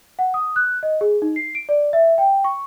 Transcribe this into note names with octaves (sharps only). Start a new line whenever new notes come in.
F#5
D#6
F#6
D#5
G#4
D#4
C7
D7
D5
E5
G5
C#6